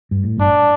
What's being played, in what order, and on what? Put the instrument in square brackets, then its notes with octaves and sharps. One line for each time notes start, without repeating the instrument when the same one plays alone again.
[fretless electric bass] G2
A2
[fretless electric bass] G1 G2 [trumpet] D4